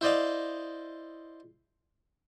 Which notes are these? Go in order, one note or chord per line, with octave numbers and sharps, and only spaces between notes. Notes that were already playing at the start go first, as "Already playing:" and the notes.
E4 C5 D5 D#5 F5